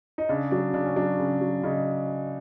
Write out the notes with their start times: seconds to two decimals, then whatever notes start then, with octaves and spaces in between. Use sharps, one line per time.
0.18 D#4
0.29 C#3 D4
0.51 F#3 D4
0.74 C#3 D4
0.85 C#4
0.96 F#3 D4
1.19 C#3
1.41 F#3
1.63 C#3 D#4